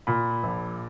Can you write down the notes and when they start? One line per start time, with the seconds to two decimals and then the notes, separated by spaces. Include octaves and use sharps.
0.07 A#2 B5
0.43 A#1